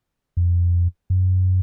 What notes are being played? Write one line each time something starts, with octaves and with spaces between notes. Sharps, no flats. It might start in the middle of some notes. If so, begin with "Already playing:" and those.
F2
F#2